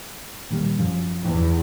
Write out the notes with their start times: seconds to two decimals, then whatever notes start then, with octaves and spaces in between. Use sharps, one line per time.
0.50 A#2 D#3 G3
0.79 F#2 F3 C#4
1.22 E2